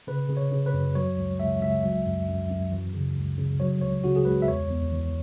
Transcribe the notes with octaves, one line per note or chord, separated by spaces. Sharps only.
C#3 B4
C#3
C#5
C#3
B4
F#2
F#3 C#5
C#2
C#2 E5
C#2 E5
F#3
F#2
F#2
F#2
E3
C#3
C#2
C#3
F#3 C#5
C#2 C#5
C#3 F#4
G#4
C#2 B4
E5
E2 C#5
E2
E3